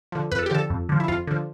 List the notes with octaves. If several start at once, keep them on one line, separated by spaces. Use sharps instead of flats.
D3 F3
F2 B4
A4
G4
D3 F3 A4
F2
D3 F3
E4
F2 F4
D3 F3